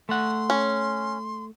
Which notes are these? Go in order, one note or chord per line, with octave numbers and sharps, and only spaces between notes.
A3 F#5 C6
C#4